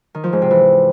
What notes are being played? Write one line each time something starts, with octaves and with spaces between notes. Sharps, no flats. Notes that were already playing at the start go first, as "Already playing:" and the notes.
D#3
F3
G#2
C3
E3